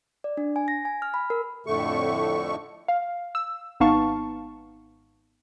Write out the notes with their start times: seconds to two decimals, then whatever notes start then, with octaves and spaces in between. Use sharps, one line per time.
0.24 D5
0.37 D4
0.56 G#5
0.68 A#6
0.85 G#5
1.02 F6
1.14 B5
1.30 A#4
1.66 F2 A2 D3 A3 C#6
2.88 F5
3.35 E6
3.80 G#1 B3 D#4 F5 A5 C#6